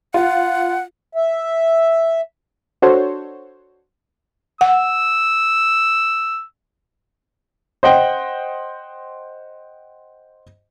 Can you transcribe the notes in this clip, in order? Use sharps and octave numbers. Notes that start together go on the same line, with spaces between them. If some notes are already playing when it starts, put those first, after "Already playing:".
F4 F#5
E5
D4 F#4 A4 C5 C#5
F#5 E6
C5 D#5 F#5 G5